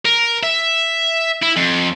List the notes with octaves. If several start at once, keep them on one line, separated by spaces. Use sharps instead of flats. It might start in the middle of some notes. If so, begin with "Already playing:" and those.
A#4
E5
E4
F2